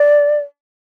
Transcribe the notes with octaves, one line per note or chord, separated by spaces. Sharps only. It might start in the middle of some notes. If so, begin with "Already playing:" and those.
Already playing: D5